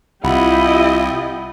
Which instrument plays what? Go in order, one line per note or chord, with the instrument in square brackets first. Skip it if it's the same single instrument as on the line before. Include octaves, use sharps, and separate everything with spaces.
[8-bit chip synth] C2 [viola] E4 D#5 [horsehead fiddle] F4 G4 [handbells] F#5 B5